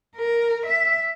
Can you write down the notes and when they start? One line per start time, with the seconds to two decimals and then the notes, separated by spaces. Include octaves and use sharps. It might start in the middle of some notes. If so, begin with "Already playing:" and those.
0.16 A#4
0.66 E5